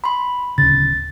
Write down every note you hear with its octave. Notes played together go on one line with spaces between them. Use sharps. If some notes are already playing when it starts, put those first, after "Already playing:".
B5 C6
D1 C#3 A6